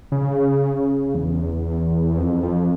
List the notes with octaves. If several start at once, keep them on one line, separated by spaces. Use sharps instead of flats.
C#3
E2
F2
F2